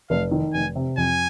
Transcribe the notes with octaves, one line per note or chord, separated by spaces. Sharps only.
F1 F5
D#3
F1 G#5
C3
F2 G#5